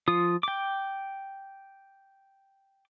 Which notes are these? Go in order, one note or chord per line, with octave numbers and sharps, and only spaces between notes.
F3 F4 D#6
G5 D6